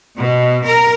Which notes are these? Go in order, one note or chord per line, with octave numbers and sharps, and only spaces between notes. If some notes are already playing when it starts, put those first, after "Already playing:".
B2
A#4